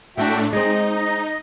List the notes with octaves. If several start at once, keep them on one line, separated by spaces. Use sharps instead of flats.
A2 A3 D4 F#4 E5 G5
G#3 C4 D#4 D#5